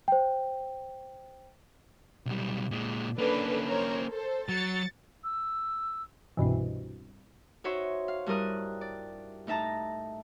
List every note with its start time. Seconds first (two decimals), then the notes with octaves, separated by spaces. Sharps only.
0.08 C5 G5
2.26 B1 G3
2.71 A#2 G#3
3.18 A#3 C#4 D4 A4 B4
3.68 A#4 C5 C#5
4.09 A4 C5
4.49 F#3 A6 C#7
5.24 E6
6.37 C2 G2 B2 E3
7.64 D#4 F#4 C5 C#5 E5
8.08 F5
8.26 G2 G3 E4 A#4 D#6 F#6
8.81 D5
9.47 A2 D#4 E5 A5 A#5